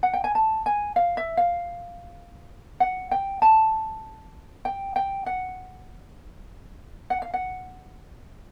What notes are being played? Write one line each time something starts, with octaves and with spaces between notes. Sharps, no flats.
F#5
G5
G#5
A5
G#5
F5
E5
F5
F#5
G5
A5
G5
G5
F#5
F#5
F5
F#5